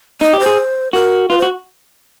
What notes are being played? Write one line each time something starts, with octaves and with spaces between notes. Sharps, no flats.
D#4 D#5
G4
C5
G#4
F#4 A#4
F4 B4
C5
F#4